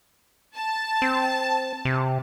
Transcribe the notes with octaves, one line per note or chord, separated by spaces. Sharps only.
A5
C4
C3